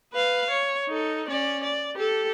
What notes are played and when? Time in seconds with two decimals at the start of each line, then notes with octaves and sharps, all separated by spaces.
0.13 B4 F5
0.50 C#5
0.89 D#4 A4
1.28 C#4 D5
1.63 D5
1.96 G4 A4